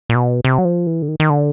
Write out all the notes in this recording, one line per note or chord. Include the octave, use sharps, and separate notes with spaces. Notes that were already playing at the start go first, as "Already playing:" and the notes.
A#2
B2
C3
F#3
F3
E3
D3
D#3
D#3
D3